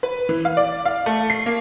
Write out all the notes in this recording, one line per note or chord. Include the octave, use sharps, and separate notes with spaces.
B4
E3
F5
D5
F5
A3
C7
A#3